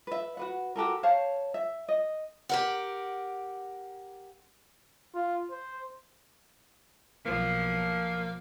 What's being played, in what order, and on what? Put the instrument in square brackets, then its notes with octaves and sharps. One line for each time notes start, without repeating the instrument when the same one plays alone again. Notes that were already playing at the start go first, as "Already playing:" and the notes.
[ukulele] B4 E5
F#4 B4 F#5
F#4 G4 A4 A#4
C5 C#5 F5 A5
E5
D#5
[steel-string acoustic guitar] G4 A#4 F#5
[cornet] F4
C5
[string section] B1 F3 [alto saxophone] A#3